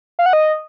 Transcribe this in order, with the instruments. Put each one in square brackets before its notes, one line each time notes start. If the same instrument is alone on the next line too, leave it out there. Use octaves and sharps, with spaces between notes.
[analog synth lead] F5
F#5
D#5